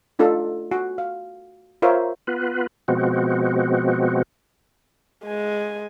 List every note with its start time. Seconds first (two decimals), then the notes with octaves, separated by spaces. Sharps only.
0.19 A3 D4 D#4 F4 A4
0.72 F#4
0.98 F5
1.82 F4 A#4 C5 C#5 E5 F5
2.27 B3 F4 B4
2.88 B2 F3 G#3 B3 C4 F#4
5.25 G#3 G#5